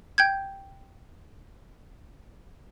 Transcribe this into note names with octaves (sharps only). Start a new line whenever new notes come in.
G5 G6 G#6